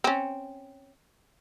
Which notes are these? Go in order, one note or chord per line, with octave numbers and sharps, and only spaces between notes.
C4 C#4